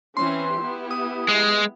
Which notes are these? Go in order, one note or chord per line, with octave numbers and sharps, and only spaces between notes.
E3 C4 C#4 C6
B3 E4 G4
D#6
G#3